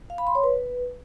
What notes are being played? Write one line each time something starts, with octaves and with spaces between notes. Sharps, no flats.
F5
B5
C6
C#5
B4